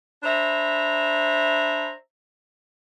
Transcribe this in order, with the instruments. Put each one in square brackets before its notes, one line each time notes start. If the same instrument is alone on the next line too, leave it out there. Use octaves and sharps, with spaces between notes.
[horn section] D4 C5 E5 A#5 B5